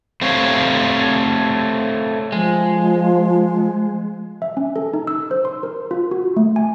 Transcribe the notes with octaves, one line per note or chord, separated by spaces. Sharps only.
A3 C4 G4 C#5 F5
F3 G#3
E5
C#4
A4
D#4
E6
C5
C6
A#4
F4
F#4
A3
G#5